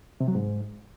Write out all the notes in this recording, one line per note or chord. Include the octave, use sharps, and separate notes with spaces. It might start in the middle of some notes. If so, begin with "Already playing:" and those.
C3
F#3
G#2